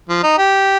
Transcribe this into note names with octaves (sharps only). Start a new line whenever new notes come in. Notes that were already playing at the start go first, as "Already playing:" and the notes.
F3
D#4
G4